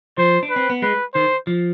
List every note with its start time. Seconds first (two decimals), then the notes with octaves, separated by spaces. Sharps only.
0.18 F3 C5
0.43 D4
0.50 B4
0.56 C4
0.70 B3
0.82 G#3 B4
1.14 D#3 C5
1.47 F3